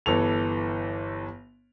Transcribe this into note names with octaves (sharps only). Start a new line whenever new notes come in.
G1 E3 A4 F7